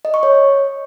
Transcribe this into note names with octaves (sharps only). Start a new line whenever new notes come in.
D#5
C#6
C#5